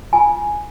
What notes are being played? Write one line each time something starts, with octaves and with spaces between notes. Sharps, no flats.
F4 G#5